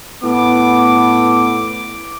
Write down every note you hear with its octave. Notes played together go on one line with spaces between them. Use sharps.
A2 B3 D6